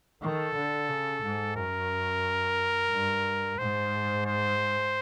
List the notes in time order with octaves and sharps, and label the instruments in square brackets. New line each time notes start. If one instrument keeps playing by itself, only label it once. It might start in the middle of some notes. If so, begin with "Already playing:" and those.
[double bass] D#3 [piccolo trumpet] A4
[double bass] D3
C#3
G#2
[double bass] F#2 [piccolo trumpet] A#4
[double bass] G2
[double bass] G#2 [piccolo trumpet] C5
[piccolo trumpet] C5